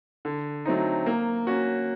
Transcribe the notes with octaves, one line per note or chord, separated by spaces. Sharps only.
D3
F#3 A3 C4 D#4
A#3
C#4 F#4